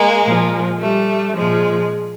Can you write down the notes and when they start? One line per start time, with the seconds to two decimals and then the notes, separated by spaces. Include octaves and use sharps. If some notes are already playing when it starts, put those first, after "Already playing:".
Already playing: G#3 A#3
0.24 A#2 F3
0.79 G3 A3
1.35 A#2 F3 G#3